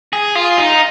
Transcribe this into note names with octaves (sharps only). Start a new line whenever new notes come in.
G#4
F4
D#4